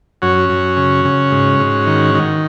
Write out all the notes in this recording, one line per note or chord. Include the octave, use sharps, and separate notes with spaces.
F#2 C#4 F#4
F#2
C#3
C#3
G#2
G#2
D#3
D#3